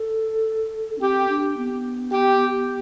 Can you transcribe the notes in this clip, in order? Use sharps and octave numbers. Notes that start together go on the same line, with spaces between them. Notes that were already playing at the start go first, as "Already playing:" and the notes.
Already playing: A4
D4
C4 G4
D4
B3
G4